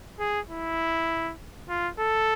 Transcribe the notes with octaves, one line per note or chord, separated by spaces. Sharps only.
G#4
E4
F4
A4